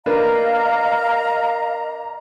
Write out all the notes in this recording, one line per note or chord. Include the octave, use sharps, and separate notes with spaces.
A#3 D4 B4 D#5 F5 A#5